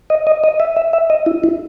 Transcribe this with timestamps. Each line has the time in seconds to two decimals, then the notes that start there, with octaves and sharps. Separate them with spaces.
0.10 D#5
0.27 D#5
0.44 D#5
0.60 E5
0.77 E5
0.93 E5
1.10 D#5
1.26 E4
1.44 E4